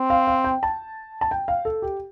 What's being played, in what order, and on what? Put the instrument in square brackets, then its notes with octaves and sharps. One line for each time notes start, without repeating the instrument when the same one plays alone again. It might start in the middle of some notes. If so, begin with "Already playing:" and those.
Already playing: [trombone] C4
[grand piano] F5
F5
G5
A5
A5
G5
F5
A4
G4